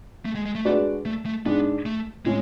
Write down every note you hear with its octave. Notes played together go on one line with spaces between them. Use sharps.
A3
G#3
G#3
A3
G#3 D4 F#4 B4 D5
A3
A3
G#2 G#3 B3 D4
A3
A2 G#3 C#4